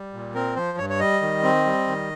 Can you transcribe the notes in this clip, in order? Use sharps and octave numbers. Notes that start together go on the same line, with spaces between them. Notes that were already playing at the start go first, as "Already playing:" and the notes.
Already playing: G3
A#2
C4 A#4
F3 C5
G2 C#5
C#5
G3 D#5
D#3
C4
G3
D#3